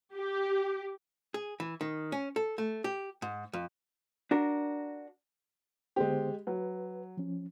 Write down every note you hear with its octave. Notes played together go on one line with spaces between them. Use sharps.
G4
G#4
E3
D#3
C#4
A4
A3
G4
G#2
F2
D4 F#4 A#4
D3 G#3 B3 G4 C5
F#3 B4
F3 C#4